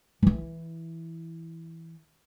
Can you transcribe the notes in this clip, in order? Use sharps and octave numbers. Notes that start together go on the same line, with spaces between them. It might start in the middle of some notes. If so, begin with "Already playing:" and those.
E3 E4